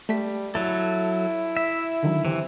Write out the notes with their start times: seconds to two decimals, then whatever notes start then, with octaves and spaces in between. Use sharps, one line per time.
0.09 G3 A3 B6
0.55 F#3 E4 A4
1.57 E5
2.03 D3 D#3 F#3
2.25 C3 E3